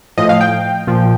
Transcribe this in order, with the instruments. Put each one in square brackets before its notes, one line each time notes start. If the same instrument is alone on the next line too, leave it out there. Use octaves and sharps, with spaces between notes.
[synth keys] A2 F3 D#5
F5
G5
A#2 F3